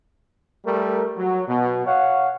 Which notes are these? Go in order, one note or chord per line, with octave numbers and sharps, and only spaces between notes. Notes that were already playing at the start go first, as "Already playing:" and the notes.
G3 A3 A#4
F#3
B2
C#5 F5 F#5